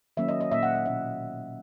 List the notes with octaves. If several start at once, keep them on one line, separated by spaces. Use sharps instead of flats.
D#3 F#3 A#3 C#4 E5
D#5
D#5
A#2 A#3 C#4 E5
F#5
E5
B2 A#3 C#4 E5